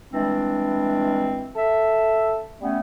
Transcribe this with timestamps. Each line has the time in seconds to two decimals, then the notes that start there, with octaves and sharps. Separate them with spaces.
0.13 E3 G3 G#3 C4 D4
1.56 A4 E5
2.61 G3 A3 B3 C#4